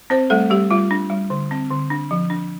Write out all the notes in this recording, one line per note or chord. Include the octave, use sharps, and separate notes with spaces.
C4 C5
G3 A3 A4
G3 G4
G3 F4
D4
G3
D3
C4
D3
D4
F3
D4